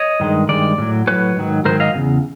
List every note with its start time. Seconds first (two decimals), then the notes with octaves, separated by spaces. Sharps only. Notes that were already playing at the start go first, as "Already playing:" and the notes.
Already playing: C#5 D#5
0.20 G2 D#3 G#3
0.49 G2 D#3 G#3 D5
0.78 A2 F#3
1.07 A2 F#3 B4 C#5
1.36 G#2 D#3 F#3
1.65 G#2 D#3 F#3 A#4 C5
1.80 D#5 F5
1.95 E2 C#3